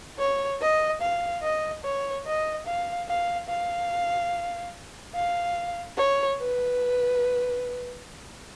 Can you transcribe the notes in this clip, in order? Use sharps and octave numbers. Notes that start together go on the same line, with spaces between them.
C#5
D#5
F5
D#5
C#5
D#5
F5
F5
F5
F5
C#5
B4